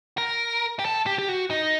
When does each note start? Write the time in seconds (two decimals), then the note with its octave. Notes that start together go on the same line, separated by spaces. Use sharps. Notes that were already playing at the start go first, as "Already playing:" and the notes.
0.18 A#4
0.79 G4
0.84 A4
1.06 G4
1.18 G4
1.29 F#4
1.51 D#4